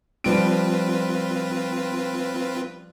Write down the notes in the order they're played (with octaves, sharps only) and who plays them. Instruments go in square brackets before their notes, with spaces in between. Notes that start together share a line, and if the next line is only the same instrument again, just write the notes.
[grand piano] F3 G3 D7 [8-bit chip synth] C4 F4 B4